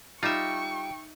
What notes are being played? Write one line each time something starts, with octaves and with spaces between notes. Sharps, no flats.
G3 D#4 F4 E5 G5 C#6